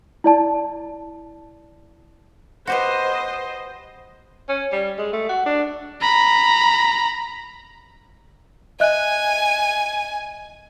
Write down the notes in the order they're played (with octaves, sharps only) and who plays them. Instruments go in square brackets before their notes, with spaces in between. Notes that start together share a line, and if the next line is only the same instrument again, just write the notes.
[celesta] E4 D5 A5
[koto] F#4 G4 B4 [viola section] C5 D#5
[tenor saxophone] C#4
G3
G#3
A3
F#4
D4
[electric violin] A#5 B5
[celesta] D#5 E5 F#6 [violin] G#5